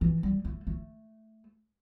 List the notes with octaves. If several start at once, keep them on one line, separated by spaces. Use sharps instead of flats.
E3
G3
A3
A3